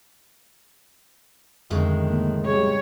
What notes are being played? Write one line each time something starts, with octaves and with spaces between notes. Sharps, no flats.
F2 A2 D3 D#3 G#3
A#3
C#3 G3 G#4 C#5